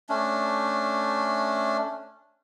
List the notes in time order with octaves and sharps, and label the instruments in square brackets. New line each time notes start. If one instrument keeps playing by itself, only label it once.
[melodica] A3 C#4 D4